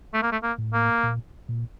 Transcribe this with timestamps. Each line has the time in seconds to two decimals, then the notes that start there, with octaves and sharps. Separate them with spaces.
0.13 A3
0.23 A#3
0.32 A3
0.43 A#3
0.58 A2
0.73 A#3
1.03 A#2
1.49 A#2